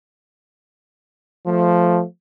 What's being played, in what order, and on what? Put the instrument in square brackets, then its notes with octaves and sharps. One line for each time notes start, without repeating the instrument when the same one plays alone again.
[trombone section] F3 A3